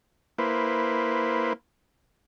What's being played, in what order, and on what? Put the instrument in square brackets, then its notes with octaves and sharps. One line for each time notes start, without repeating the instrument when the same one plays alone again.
[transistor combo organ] A#3 E4 B4 C5